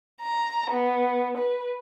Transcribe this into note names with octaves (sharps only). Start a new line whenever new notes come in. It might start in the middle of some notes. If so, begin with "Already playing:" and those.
A#5
B3
B4